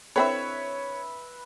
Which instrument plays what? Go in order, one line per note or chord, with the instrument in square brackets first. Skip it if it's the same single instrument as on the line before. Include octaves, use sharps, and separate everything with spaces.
[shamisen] D3 C4 E4 [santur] B4 E5 [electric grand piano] C#5